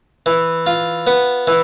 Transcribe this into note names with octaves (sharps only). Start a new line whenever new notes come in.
E3
F4
B3
E3